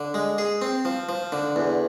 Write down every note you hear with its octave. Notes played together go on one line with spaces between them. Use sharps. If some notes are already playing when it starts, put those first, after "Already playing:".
Already playing: D3
G#3
G#4
C4
F3
F3
D3
E2